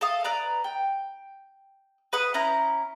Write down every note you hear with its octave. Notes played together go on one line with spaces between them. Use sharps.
A4 F5 D#6
B4 D5 A#5
G5
B4 F#5 D#6
C#4 E4 A#5 G6